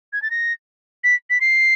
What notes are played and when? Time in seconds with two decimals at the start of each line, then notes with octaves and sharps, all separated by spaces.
0.13 G#6
0.22 A6
0.31 A#6
1.04 B6
1.30 B6
1.41 C7